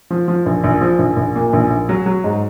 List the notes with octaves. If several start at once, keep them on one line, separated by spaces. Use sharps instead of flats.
F3
F3
A#1
A#1
F3
A#1
A#1
A#2
A#1
A#1
F#3
F#3
G#2